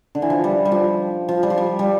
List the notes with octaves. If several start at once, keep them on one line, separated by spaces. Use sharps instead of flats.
D3
E3
F3
G3
G3
F3
F3
G3
F3
G3
G3